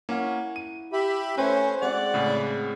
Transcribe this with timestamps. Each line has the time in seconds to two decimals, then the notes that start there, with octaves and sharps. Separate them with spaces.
0.09 A#3 C#4 E4 F#5 C#6
0.56 D#7
0.93 G4 E5 B5
1.38 A3 C#4 B4 C5
1.82 G#3 C4 F#4 D5 F#5
2.14 A2 C#3